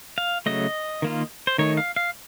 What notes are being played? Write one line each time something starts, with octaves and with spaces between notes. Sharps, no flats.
F5
C#3 F#3 A3 D#5
D#3 A#3 F4
C5
D#3 A3 D#4 C#5
F5
F5